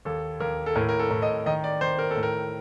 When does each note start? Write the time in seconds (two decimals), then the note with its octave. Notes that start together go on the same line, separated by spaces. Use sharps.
0.05 D#2 A4
0.40 D#2 A#4
0.66 A4
0.75 A2 A#4
0.89 A#4
0.99 A4
1.11 A2
1.22 D#5
1.46 D#3 D#5
1.64 D5
1.81 D#3 C5
1.99 A#4
2.11 A4
2.16 A2
2.23 A#4